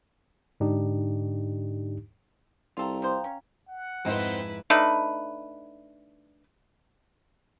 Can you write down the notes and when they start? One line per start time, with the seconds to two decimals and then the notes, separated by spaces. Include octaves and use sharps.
0.60 G#2 D3 D4 D#4 G4
2.77 C2 F4 A4 F5 G5 A#5
3.02 F3 C5
3.24 C#4
3.69 F#5
4.05 F2 G#2 C4 D#4 E4 B4 C5
4.70 A3 D4 D#4 B4